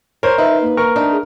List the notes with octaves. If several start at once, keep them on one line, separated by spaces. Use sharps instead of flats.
A#4 C5 C#5
D#4 B4 E5
A#3
A#4 C#6
A3 C4 D4 D#4
G#4